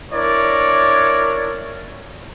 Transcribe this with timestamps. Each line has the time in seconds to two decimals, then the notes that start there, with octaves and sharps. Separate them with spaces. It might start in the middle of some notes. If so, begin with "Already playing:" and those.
0.12 D4 E4 A#4 C#5 D5